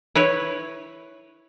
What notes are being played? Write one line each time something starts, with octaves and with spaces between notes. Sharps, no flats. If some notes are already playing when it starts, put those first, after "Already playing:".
E4 B4 C#5